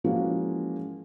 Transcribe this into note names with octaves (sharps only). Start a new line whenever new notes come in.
E3 F3 G#3 A#3 C#4 F#4